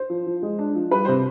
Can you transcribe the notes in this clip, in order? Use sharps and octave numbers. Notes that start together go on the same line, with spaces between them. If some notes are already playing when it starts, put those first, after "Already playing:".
Already playing: C5
F3
F3
G#3
D4
F3
G3 B4
C3 C5